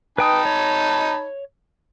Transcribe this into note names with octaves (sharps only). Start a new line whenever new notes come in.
D#4 B4 G5 A5 B5 D#6
C#5